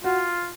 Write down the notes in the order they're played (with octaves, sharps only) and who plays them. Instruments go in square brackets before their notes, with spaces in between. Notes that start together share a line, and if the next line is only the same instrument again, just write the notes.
[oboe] F4 [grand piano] F#4